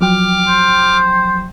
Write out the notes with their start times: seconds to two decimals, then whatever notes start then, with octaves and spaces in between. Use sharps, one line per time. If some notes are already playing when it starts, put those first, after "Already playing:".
0.01 F3 F#3 G5 D6 F6
0.48 C5